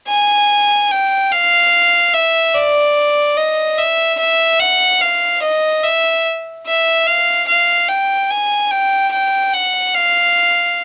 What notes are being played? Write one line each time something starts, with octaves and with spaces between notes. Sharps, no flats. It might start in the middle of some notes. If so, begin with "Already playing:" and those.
G#5
G5
F5
E5
D5
D#5
E5
E5
F#5
F5
D#5
E5
E5
F5
F5
G5
G#5
G5
G5
F#5
F5